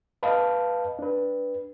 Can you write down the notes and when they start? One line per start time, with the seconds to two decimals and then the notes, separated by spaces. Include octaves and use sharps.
0.23 B4 D#5 F5 A5 B5
0.99 D4 B4